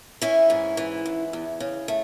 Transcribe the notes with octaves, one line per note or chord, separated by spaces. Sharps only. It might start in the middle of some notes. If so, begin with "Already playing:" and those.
E3 C#4 E4
G#2
E3
G#2
E2
C#3
A3